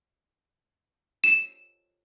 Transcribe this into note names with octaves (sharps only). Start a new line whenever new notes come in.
E7